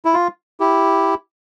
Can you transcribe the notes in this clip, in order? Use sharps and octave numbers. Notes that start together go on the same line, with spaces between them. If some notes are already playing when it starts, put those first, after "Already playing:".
E4
F4
E4 G4